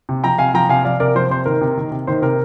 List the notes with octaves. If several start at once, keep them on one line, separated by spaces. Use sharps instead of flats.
C3
F3 G5 A#5
C3 F5 G#5
F3 G5 A#5
C3 F5 G#5
F3 D5 F5
C3 A#4 D5
F3 C5
C3 C5
D#3 A#4
C3
D#3
C3
D#3 C5
C3 A#4